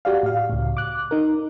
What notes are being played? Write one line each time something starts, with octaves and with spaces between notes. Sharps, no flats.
F#4 G4 D5 F5
A2 F5
C#2 A2
D6 F#6
D#4 A#4